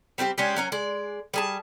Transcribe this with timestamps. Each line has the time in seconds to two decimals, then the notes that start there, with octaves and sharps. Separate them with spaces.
0.18 G3 C4 F#4 G4
0.38 G#3 C#4 D4 G4
0.56 F#3 C#4 A#4
0.72 G#3 D5
1.34 G3 G#4 A5